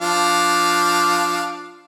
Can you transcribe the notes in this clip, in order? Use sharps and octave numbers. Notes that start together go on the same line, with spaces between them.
F3 D4 F5